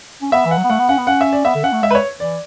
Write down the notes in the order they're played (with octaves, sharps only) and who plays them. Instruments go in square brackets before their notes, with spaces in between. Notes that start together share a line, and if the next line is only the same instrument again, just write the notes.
[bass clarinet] C#4
[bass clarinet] B3 [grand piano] E5
[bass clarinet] E3
[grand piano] F#5
[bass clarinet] F#3
B3
[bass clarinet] A3 [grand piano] F#5
[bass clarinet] B3
[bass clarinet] C#4 [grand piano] F#5
[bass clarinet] B3
[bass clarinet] C#4 [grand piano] F#5
[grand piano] E5
D5
[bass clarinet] B3 [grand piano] E5
[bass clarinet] D3
[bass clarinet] C#4 [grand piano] F#5
[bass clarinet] A3
[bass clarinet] G#3 [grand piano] E5
[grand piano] B4
C#5
[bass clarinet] E3 [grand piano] D5